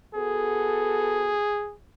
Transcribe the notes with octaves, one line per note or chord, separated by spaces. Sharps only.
B3 F#4 G#4 A4